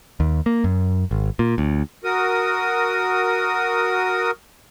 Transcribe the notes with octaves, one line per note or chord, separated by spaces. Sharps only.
D#2
A#3
F#2
G#1
A#2
D2
F#4 A#4 D#6